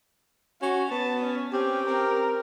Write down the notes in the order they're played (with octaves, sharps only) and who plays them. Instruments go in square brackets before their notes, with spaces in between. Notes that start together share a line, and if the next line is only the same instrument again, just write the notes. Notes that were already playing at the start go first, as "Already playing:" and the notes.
[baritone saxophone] C#4 [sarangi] F#4
[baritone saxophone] B3 [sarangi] A5
[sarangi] C#4
[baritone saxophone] C4 [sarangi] C#4 [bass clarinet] G4
[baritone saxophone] C4 [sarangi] A#4